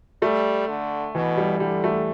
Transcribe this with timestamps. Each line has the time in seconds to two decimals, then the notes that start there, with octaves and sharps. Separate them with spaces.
0.22 G3 A3
0.68 D3
1.15 B2 E3
1.37 G3
1.60 D3 G3
1.84 A3